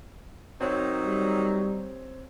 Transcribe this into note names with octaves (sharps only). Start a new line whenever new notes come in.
D#3 F#3 C4 D#4 C#5
G3